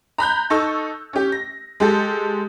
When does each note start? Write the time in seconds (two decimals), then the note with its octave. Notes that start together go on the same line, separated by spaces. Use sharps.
0.18 A#5 B5 F#6 G6
0.50 D#4 A4 C#6 E6
1.13 C#4 G4
1.32 A#6
1.80 G#3 G4 A4